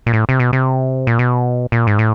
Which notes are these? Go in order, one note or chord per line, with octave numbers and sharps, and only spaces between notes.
A#2
A2
C3
B2
C3
A#2
B2
A#2
G#2
A2